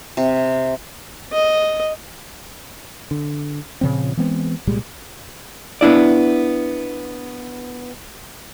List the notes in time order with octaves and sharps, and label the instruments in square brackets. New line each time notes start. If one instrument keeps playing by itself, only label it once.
[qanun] C3
[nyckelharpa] D#5
[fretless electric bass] D3
A#2 C#3 F3 C4
E3 G#3 B3 C4
C2 A#2 G3 G#3
[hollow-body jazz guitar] B3 D4 E4 D5